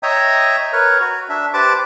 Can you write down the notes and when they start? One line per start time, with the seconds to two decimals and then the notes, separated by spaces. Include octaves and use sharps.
0.03 C#5 D#5 E5 G5 A#5 D#6
0.73 A#4 B4 C#5
1.01 F#4
1.29 D4 E5
1.54 G4 B4 C5 A5 D6